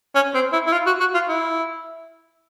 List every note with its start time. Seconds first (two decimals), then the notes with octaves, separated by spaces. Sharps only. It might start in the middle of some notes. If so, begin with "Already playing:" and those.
0.15 C#4
0.34 C4
0.53 E4
0.67 E4
0.72 F4
0.86 F#4
1.00 F#4
1.14 F4
1.29 E4